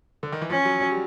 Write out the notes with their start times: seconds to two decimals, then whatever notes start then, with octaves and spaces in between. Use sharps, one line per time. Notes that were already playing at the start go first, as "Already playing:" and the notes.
0.23 D3
0.32 D#3
0.42 E3
0.50 F3 C#4
0.65 F#3
0.82 F#3
0.91 G3